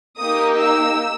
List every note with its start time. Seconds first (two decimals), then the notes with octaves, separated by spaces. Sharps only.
0.19 A#3 D#4 G4 D#6
0.58 E6